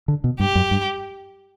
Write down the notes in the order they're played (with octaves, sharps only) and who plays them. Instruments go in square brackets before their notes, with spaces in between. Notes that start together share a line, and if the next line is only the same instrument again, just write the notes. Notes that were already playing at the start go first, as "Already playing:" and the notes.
[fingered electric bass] D3
B2
[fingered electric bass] G2 [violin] G4
[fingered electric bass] F#2
G2